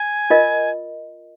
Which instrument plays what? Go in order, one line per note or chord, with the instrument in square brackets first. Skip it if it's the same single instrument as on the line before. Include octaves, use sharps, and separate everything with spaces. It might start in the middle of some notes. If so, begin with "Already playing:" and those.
Already playing: [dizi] G#5
[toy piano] F4 A#4 D#5